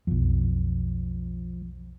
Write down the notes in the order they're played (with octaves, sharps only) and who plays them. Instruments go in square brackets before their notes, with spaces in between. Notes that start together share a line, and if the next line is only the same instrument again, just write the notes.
[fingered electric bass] B1 F2 [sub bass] F3